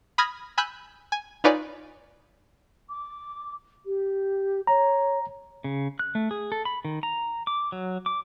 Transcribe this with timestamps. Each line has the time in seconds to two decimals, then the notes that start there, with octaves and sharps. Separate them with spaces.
0.18 B5 D#6 F6 G#6 A#6
0.58 G#5 B5 E6 F#6 G6
1.12 G#5
1.44 D#4 F4 B4 C#5 D5 G#5
2.90 D6
3.86 G4
4.67 C#5 A#5
5.64 C#3
5.99 F#6
6.15 A3
6.31 G#4
6.52 A4
6.65 B5
6.85 D#3
7.03 A#5
7.47 D6
7.72 F#3
8.06 D6